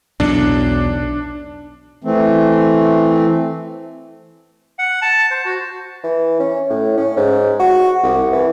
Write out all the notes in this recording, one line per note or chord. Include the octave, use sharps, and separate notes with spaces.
B1 E2 A2 D4
E3 A3 C4
F#5
A5
C5
F#4
E3
C#4
A2
C#4
G#2
F#4
C2
E3